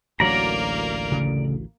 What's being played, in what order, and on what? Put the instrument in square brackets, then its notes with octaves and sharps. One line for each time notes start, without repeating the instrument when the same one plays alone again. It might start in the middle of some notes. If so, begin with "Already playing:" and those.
[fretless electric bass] A1 D2 F#3 [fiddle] A#3 A#4 [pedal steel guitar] D5 A#5
[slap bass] C#3 A3